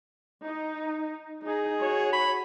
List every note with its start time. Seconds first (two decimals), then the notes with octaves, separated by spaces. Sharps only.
0.45 D#4
1.44 D#4 G#4
1.79 F#4 C#5
2.13 B5